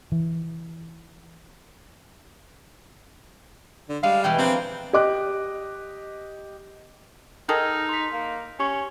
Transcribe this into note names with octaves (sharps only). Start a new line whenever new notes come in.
E3
D3
G3 G#3 F5
B2 E3 G#3 G5
F3 A#3 C4 D4
G4 D#5 D6 F#6
D#3 D#4 G#4 A4 E6 F6 A#6
C6 B6
A#3
C#4 G4 C#6